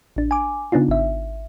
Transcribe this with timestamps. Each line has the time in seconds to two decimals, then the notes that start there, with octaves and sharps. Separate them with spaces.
0.16 A1 D4
0.31 G#5 D6
0.72 C#3 B3 D4 D#4 F4
0.89 G#1 E5